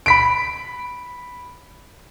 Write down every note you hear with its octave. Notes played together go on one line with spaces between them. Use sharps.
B5 B6 D7